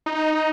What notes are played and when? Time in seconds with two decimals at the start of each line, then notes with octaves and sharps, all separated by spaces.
0.06 D#4